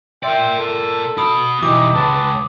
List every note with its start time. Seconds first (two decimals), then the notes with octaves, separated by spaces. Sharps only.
0.23 A#4 D5 E5 G5 C6
0.59 A4
1.18 F#4 B5 D#6
1.63 B2 E3 D#4 E4 G4 D6
1.95 C#2 B4 A5